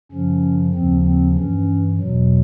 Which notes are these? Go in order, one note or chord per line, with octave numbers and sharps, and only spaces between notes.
F#2 C#3 F3 C#4
D#2 C#3 F3 C4
C4
G2 E3 C#4
E2 B2 F#3